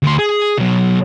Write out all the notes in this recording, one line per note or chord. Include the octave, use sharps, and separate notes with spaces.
D2 C6
G#4
B2 F#3